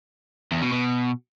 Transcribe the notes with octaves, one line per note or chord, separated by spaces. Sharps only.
E2
B2
B2